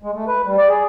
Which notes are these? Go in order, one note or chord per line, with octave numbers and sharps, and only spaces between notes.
G#3
A3
B4
G3
D5
G#4